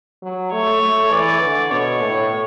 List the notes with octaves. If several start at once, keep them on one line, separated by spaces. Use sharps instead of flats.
F#3
A3 C#5
A3
E3 D5
D3
B2 C#5
A2